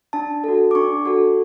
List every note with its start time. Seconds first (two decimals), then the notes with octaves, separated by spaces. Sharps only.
0.13 D4 A5
0.44 F#4 A4
0.71 D6
0.75 D4 C#6
1.06 F#4 A4